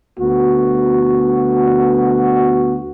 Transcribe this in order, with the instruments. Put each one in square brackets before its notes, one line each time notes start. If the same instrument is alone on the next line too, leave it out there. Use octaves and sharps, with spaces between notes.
[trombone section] D2 B3 F#4